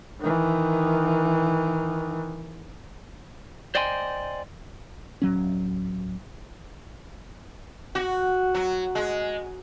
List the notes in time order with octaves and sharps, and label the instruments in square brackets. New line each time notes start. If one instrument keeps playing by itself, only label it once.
[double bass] D#3 E3
[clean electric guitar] C5 D5 D#5 G5 G#5 C6
[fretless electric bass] D1 F#3 C#4
[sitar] F#4
F#3
G#3